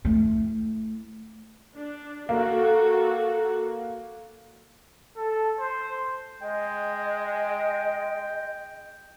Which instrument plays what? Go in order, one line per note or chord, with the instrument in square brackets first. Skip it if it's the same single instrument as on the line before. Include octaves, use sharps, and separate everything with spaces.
[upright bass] A3 E4
[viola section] D4
[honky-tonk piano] A#3 [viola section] F#4 A4
[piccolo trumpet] A4
C5
[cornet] G#3 [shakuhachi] D#5 [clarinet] G5